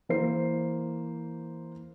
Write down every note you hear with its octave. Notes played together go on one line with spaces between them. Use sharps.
E3 A#3 C5 C7